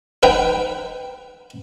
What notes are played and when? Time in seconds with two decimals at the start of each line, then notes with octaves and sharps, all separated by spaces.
0.23 D#4 B4 G5